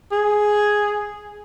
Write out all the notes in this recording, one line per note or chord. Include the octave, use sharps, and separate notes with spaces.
G#4